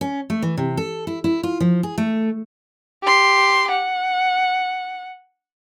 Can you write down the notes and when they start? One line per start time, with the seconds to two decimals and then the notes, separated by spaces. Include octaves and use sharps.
0.01 C#4
0.30 A3
0.42 E3
0.57 C3
0.77 A4
1.07 E4
1.24 E4
1.43 F4
1.60 F3
1.83 G#4
1.98 A3
3.03 G4 C6
3.71 F#5